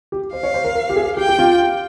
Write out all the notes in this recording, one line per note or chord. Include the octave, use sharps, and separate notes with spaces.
G4
C5 F5
C#5
C5
A#4
A#4
G4
G#4
G4 G5
G4
F4